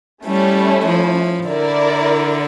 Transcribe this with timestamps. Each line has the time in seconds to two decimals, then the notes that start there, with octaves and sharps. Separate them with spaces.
0.25 G3 A3 C#4 E4
0.86 F3
1.47 D3 E4 A#4 D5